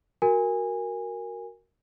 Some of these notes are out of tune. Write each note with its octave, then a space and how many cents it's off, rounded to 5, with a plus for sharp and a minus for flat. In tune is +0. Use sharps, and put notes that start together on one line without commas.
F#4 +0 A#4 +0 G#5 -20